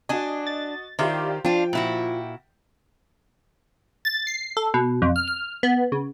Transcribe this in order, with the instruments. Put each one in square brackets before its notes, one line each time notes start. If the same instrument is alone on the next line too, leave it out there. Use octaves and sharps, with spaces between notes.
[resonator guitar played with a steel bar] D4 G#5 [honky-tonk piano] F#4 D#5
[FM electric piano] A6
[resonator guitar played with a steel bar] D#3 [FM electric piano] E4 D5 F5 [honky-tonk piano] F4 G4 C5
[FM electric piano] F3 [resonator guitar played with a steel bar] D4 F4 [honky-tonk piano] G5
[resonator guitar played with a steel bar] A#2 E4 F#4
[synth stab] A6
C7
A4
B2
F2
F6
F6
B3
C#3